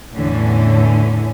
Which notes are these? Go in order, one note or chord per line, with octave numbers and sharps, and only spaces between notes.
E2 A2 D3 E3 C#4